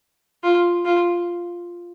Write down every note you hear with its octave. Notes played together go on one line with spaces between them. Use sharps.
F4
F4